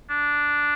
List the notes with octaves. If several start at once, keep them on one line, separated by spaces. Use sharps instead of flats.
D4